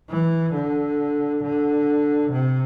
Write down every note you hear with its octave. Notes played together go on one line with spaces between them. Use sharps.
E3
D3
D3
C3